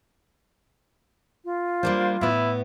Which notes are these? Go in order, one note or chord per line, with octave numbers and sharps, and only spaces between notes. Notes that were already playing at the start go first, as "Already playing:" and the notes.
F4
G3 A#3 D4 C5
A2 B3 E4